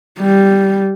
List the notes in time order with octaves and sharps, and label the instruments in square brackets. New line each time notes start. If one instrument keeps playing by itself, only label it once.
[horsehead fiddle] G3